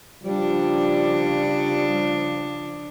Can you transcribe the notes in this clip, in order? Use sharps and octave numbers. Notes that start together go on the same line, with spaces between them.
C#3 F3 G3 D4